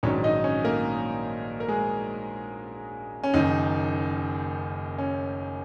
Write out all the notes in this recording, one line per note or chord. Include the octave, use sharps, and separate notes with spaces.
A#1 G#2 D#3 F#3 C#4 C#5
D#4 D#5
C#4 C#5
A#3 A#4
A#4
G#3 G#4
C#4
F#1 F#2 D#3 D#4
C#4